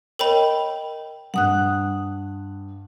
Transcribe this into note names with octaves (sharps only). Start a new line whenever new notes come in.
A#4 C#5 D#5 G5 B5
G2 F#5 D#6 F#6